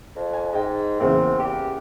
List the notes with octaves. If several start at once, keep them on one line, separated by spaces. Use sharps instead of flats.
F2
G#5
G#2 D#5 G5
E2 C#3 A#3 C4
G4